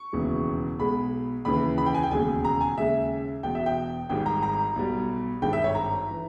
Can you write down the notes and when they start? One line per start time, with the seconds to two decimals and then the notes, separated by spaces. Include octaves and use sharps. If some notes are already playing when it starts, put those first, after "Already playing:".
Already playing: C#6
0.13 E1 D#2 C#3 E3 G#3
0.79 B1 B2 G#3 B5
1.45 D#2 C#3 E3 B5
1.78 B5
1.86 G5
1.94 G#5
2.03 G5
2.11 E1 D#2 C#3 G#3 G#5
2.44 A#5
2.61 G#5
2.77 D#2 C#3 G#3 E5
3.43 E1 E2 B2 G5
3.55 E5
3.66 G5
4.09 G#1 G#2 D#3 G3 G5
4.26 A#5
4.43 A#5
4.76 B1 B2 G3
5.42 G#1 G2 D#3 G#3 G5
5.53 E5
5.64 C#5
5.75 A#5
6.11 E3